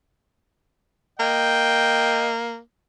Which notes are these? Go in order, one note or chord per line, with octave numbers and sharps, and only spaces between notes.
A#3 D#5 G5